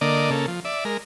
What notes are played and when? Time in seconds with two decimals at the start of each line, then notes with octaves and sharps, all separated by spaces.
0.01 D3 A#3 D5 D#5
0.30 C#3 A#3 A4
0.48 F3
0.65 D5 E5
0.85 G#3 A#4